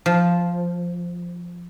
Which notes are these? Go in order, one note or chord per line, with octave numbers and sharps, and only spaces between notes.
F3